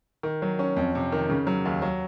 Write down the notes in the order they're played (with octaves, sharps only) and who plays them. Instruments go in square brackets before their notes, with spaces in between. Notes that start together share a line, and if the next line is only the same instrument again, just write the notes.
[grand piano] D#3
F#3
C#4
F2
C3
D#3
C#3
F#3
D#2
F#3